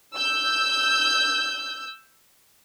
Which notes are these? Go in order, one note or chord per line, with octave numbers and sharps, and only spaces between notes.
E6 G6